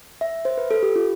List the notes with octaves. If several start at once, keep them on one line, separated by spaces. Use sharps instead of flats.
E5
C5
B4
A4
G4
F4